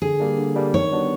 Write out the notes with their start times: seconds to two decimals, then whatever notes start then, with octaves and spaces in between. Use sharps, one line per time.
0.02 D3 G#4
0.20 G3 A#3 D4
0.38 D3
0.56 G3 A#3 D4
0.73 D#3 C#5
0.92 G3 B3 D4 F#4